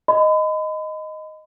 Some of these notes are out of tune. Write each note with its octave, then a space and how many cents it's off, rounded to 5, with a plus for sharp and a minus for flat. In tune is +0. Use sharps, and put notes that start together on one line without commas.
D#5 +0 B5 +40